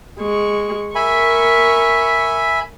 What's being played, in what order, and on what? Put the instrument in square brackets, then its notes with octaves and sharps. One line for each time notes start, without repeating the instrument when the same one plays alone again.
[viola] G#3 C#6
[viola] A#4 C#6 [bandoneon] E5 G#5 B5